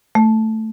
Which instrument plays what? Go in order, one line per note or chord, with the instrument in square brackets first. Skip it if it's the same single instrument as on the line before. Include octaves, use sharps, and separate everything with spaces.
[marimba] A3